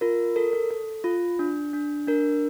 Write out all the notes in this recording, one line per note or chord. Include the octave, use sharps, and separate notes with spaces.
F4 A#4
A4 A#4
A4
A4
F4
D4
D4
D4 A#4